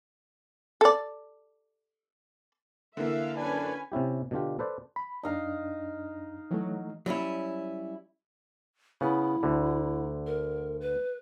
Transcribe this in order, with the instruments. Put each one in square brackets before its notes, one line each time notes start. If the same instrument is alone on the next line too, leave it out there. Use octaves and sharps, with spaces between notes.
[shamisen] A4 D5
[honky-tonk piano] D3 E3 A#3 [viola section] E5 F5
[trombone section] F#2 D4 [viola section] C#4 B4 G#5
[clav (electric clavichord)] C3 C#4 E4 G4
B2 D3 D4 F4 G4
A4 B4 C5 D5
[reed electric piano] B5
[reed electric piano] F#2 D4 [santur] D#4 F5 A#5
[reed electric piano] E3 A3 [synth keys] F#3
[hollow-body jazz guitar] F#3 G3 C#4 E4
[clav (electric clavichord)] C#3 B3 [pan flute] E4
[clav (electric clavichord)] D2 D3
[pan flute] A#4
B4